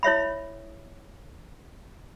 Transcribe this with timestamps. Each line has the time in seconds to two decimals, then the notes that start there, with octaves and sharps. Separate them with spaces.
0.03 E4 C#5 E5 B5